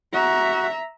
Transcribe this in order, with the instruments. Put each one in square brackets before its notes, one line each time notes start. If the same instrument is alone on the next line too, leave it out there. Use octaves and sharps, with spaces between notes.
[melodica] F#4 F#5 [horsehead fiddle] E5 A#5